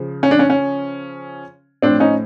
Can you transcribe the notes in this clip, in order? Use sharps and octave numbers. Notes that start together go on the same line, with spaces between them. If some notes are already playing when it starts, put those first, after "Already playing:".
Already playing: C#3 F3
C#4
D4
C#4
C#4
A2 F3 C4 D4
C#4 D#4